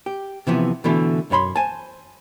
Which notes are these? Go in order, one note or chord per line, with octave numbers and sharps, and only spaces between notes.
G4
C3 E3 F3 B3
B2 D3 E3 A3
B1 F#2 C#5 B5 C6
C5 G#5 A5